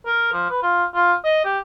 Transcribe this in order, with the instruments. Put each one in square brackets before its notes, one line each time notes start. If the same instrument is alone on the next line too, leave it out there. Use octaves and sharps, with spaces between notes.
[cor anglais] A#4
F3
B4
F4
F4
D#5
G4